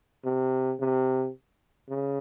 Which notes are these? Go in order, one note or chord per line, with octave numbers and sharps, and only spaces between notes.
C3
C3
C#3